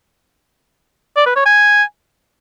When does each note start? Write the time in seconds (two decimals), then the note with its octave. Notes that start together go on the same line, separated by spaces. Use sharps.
1.16 D5
1.26 B4
1.36 C#5
1.45 G#5